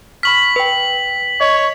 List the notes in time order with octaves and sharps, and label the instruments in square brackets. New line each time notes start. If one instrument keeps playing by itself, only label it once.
[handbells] B5 C#6 F6 [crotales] B6 F#7
[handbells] B4 G5
[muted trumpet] C#5 [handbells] D#5